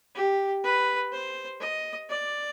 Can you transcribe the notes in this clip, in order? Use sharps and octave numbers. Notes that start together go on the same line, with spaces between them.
G4
B4
C5
D#5
D5